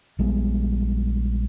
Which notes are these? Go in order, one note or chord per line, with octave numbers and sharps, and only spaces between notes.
A#1 G3 G#3 B3